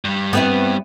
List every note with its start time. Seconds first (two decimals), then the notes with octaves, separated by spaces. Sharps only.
0.05 G2 G3
0.33 B3 C4 E4